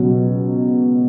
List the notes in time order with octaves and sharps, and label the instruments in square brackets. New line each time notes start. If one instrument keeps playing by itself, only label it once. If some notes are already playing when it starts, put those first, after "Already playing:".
Already playing: [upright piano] C#2 B2 F#3